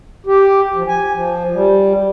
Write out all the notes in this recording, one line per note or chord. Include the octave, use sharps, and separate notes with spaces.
G4
F3
G#5
F3
G3